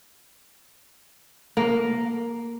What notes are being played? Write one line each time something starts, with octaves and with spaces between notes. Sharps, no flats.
A#3